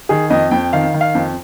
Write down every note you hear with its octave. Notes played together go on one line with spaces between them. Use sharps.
D#3 G#4
F2 D#5
F2 G5
D#3 F5
D#3
F5
F2